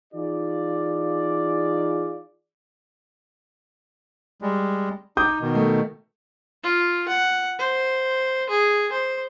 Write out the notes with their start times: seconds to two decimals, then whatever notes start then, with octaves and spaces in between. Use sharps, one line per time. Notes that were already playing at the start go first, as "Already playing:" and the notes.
0.13 E3 D#4 F4 G#4 D5
4.42 G3 G#3
5.17 D#4 D6 D#6 G6
5.41 B2 D#3
5.55 A3
6.64 F4
7.08 F#5
7.59 C5
8.49 G#4
8.92 C5